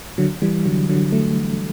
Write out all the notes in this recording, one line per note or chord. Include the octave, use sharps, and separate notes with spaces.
D3 F#3
E3 G3
D3 F#3
D3 F#3
F#3 A3